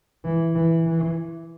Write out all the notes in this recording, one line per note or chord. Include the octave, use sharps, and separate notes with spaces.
E3
E3
E3